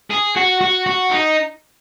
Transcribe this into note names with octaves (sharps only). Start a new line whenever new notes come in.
G#4
F#4
F#4
F#4
D#4